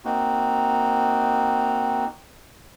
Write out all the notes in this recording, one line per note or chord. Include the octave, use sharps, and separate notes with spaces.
A#3 C4 D#4 F#4